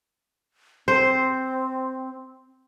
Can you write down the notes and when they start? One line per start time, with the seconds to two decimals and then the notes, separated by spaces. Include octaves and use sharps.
0.88 C4 C5